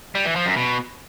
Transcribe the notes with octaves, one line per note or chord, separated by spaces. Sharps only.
G3
E3
F3
F#2
B2